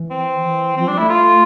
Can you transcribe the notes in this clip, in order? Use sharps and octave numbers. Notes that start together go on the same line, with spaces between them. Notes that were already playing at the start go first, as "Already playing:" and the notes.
Already playing: E3
C4
E3
F3 C4
G3 D4
A3 E4
F4